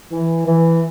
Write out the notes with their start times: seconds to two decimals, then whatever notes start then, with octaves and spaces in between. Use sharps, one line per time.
0.11 E3
0.46 E3